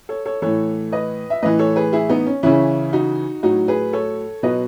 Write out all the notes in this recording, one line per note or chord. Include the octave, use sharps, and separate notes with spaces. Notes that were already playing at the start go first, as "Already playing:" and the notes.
A4 C#5
A4 C#5
A2 E3 A4 C#5
B4 D#5
E5
A2 E3 B4 D#5
A4 C#5
G#4 B4
E4 G#4
B3 D#4
C#4
C#3 E3 C#4 E4
D#4 F#4
A2 F#3 D#4 F#4
G#4 B4
A4 C#5
B2 F#3 B4 D#5